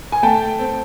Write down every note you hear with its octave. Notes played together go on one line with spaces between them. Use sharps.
G#5
A3 G5 A5
C4